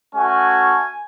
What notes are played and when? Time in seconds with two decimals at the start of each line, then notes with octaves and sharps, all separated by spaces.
0.15 A3 C#4 F#4 G#5